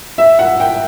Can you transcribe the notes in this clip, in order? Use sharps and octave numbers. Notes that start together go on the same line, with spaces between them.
E5
F#5
G5